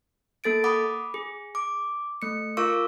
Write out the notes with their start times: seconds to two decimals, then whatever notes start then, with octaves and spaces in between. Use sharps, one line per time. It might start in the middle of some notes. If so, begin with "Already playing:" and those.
0.44 A#3 A4 A6 D7
0.64 F#5 B5 D6 D#6
1.14 G#4
1.55 D6
2.22 A3 C#7
2.57 F4 A#4 F5 C#6 D6 E6